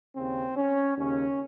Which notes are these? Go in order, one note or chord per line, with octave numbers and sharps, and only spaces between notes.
D#2 C#3 C4
C#4
D#2 C#3 C#4